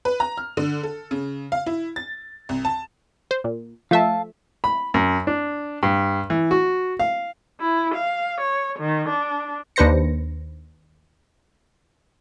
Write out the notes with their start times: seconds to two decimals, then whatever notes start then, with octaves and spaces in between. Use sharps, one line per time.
0.05 B4
0.20 A#5
0.38 F6
0.57 D3
0.83 A4
1.11 C#3
1.52 F5
1.66 E4
1.96 A6
2.49 C2
2.65 A5
3.31 C5
3.44 A#2
3.91 F3 A3 E5 F5 A5
4.64 B5
4.94 F#2
5.27 D4
5.83 G2
6.30 E3
6.51 F#4
7.00 F5
7.60 E4
7.96 F5
8.41 C#5
8.80 D#3
9.09 D4
9.76 D#2 D4 B4 C5 A#6 C#7